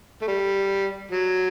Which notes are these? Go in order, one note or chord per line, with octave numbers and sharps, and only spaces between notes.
A3
G3
F#3